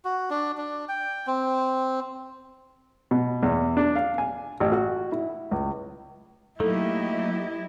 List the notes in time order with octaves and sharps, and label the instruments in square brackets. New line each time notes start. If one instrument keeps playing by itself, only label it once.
[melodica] F#4
D4
D4
G5
C4
[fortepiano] B2
E2
D4
F5
G#5
A1
F#4
E4
C#2
[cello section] F#3 G4 D#5 [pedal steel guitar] A3 A#3 D#4 [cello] E4 [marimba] A4